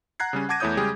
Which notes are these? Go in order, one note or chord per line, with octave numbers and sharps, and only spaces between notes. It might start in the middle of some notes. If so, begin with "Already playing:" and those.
F#5 A#5 F#6 G#6 C7
C#3 G3 C#4
F#5 A5 D6 G#6 A#6 D#7
E2 A3 E4 C#5 D#6 G6
C#3 G3 G#3 G4 G#4